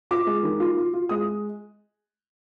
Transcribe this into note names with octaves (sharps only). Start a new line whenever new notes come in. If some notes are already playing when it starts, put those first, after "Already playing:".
F4 D6
G#3
D#3
F4
F4
F4
G#3 D#6